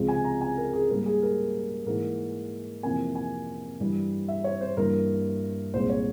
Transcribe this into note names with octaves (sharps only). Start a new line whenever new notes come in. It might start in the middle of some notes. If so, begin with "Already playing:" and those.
Already playing: C#2 C3 F3 G#3
G#5
A#5
G#5
A#4
G#4
G#2 G3 A#3 A#4
G#4
A#4
G#2 E3 A#3 A#4
F2 C3 E3 A#3 G#5
G#5
G2 E3 G3
E5
C#5
C5
G2 E3 A#3 A#4
C2 A#2 G#3 C5
C#5